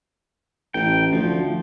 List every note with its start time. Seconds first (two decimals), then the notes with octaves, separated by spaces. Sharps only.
0.74 A1 G5
1.13 D2 F3